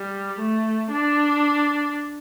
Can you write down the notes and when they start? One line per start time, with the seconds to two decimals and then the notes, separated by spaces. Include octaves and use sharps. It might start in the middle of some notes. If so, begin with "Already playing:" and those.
Already playing: G3
0.39 A3
0.92 D4